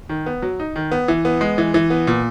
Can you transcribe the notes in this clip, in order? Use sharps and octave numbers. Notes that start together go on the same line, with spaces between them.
D#3
B3
F#3
D#4
D#3
B3
E3
B3
G#3
E3
E3
B3
A#2